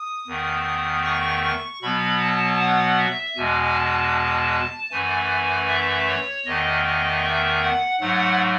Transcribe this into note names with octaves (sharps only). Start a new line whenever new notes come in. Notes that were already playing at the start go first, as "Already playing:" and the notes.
Already playing: D#6
E2 D#3 A3
C#6
B2 F#3 B3 B5
A5
F#5
E5
E2 B2 G#3 G#5
A5
F#2 E3 A3 G#5
E5
C#5
E2 D#3 A3 D#5
D#5
E5
F#5
G#2 F#3 A3 F#5